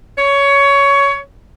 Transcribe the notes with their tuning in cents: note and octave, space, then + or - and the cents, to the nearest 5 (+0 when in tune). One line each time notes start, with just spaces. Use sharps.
C#5 +15